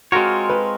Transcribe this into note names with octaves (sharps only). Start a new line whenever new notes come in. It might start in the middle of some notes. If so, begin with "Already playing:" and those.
G#3 C4 F4 F#4 A#4 C#5
B4